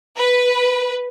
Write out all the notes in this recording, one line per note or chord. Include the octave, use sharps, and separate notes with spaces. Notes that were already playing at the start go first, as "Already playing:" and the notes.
B4